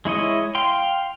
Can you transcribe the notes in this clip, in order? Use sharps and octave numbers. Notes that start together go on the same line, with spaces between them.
G#3 E4 C#5 D#5
F5 G5 C6